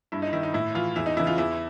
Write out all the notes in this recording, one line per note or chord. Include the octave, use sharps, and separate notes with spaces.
G2 E4
D#4
D#3 E4
D#4
A2 E4
E3 F4
E2 E4
D#4
C#3 E3 E4
F4
E2 E4